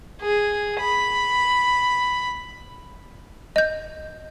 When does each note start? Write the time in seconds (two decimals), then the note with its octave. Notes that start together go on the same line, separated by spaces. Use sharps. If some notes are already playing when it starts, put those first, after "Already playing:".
0.21 G#4
0.80 B5
3.56 D#5 G6